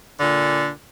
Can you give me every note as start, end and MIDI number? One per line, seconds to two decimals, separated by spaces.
0.20 0.69 46
0.20 0.69 50